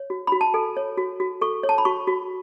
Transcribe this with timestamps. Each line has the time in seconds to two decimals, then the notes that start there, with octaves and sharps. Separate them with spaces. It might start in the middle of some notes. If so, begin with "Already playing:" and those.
Already playing: C#5
0.10 F#4
0.27 F#4 B5
0.41 A5
0.54 A4 G#5
0.77 C#5
0.98 F#4
1.20 F#4
1.41 A4 C#6
1.63 C#5
1.69 A5
1.78 B5
1.85 F#4 C#6
2.07 F#4